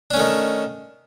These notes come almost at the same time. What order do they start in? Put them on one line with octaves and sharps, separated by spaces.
D4 C#4 A3 D#3